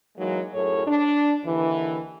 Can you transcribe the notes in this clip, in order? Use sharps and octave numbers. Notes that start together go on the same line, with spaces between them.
E3 F#3 G#3 A#3 D#4
F#2 A2 G#4 A4 C#5
D4
D#2 D3 E3